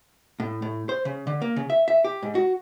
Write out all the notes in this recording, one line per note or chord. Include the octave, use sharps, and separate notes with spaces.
A2
A2
C5
C#3
D3
A#3
C#3
E5
E5
G4
G#2
F#4